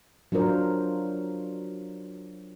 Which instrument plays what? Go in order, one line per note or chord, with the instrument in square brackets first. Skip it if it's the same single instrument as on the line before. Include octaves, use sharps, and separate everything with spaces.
[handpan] F#3 D4 F4 A#4 C5